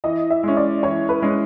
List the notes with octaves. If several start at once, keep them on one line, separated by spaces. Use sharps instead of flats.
E3 D#5
E5
G#3 C#4
D5
E3 C#5
B4
G#3 C#4